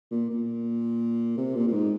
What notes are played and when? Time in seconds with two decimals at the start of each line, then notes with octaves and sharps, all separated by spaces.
0.11 A#2
0.30 A#2
1.37 C3
1.55 A#2
1.67 A#2
1.72 G#2